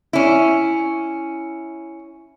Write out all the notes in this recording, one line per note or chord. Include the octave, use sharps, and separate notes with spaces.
C#4 E4